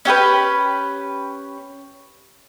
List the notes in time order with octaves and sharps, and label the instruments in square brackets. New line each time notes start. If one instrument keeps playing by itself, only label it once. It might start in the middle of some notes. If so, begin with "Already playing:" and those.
[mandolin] C#4 G4 A4 B4